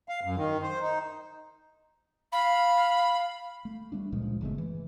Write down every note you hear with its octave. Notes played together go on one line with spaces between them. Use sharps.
F5
F#2
D#3
C5
D#4
F5 B5
A3
G3 A3 D4
C#2 A#2 F3 G#3
G1 C#3 G#3 A3
E3